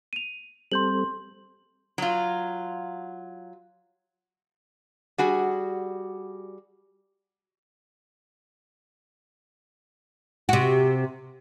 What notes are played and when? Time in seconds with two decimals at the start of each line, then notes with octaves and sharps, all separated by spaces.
0.13 D#7 F7
0.72 G3 C4 A4 C6 G6 F#7
1.98 F#3 F4
5.18 G3 F#4 G#4
10.49 C3 F#4